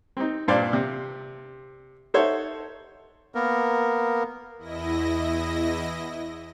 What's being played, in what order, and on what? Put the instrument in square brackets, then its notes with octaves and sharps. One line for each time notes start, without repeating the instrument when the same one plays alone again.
[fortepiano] C4 D#4
G2 A#2 C5 D5 F5
C3
D#4 A4 C5 C#5 E5 F#5
[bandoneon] A#3 B3 A#4
[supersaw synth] E2 E4 D#5 A#6